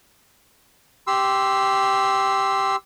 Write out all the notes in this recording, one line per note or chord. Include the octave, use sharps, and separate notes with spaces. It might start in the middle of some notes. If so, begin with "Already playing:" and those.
G4 C6 E6